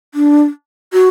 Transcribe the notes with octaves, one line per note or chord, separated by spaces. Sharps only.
D4
F#4